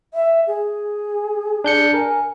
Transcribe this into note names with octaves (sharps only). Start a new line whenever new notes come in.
E5
G#4
D4 G6 C#7
A#4 G#5